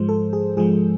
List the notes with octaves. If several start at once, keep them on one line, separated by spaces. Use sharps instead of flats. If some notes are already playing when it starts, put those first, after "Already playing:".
Already playing: G#2 F3 G#3 C5
A4
G#4
G#2 F3 G#3 G#4